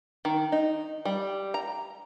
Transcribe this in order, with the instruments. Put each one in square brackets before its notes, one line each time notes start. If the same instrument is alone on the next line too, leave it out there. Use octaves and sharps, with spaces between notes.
[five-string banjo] D#3
D#4
G3
A#5